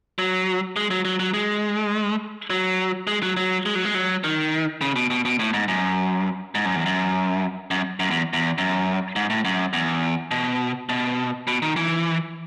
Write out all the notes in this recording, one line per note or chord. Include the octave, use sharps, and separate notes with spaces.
F#3
G#3
F#3
F#3
F#3
G#3
F#3
G#3
F#3
F#3
G#3
F#3
G#3
F#3
D#3
C#3
B2
B2
B2
A2
G#2
F#2
G#2
F#2
E2
F#2
F#2
F#2
E2
E2
F#2
G#2
A2
F#2
E2
B2
B2
B2
D#3
E3